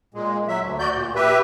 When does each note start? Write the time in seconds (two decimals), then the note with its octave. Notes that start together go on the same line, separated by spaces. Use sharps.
0.14 A#2 G#3
0.48 F#3 E5
0.61 D2
0.79 F#4 D5 G6
0.95 A#2
1.15 G4 B4 E5